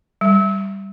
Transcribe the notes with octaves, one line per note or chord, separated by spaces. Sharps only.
G3